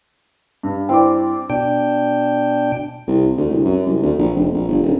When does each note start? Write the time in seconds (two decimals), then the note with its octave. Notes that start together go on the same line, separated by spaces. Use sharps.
0.63 G2
0.89 C4 E4 D5 G5
1.50 B2 D4 G5
3.07 C2
3.37 D2
3.51 C2
3.65 F#2
3.87 C2
4.02 D2
4.18 A#1
4.35 F1
4.54 A#1
4.69 G1
4.83 D#1